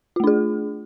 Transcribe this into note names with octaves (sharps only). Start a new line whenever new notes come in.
A3 D4 F4 G#4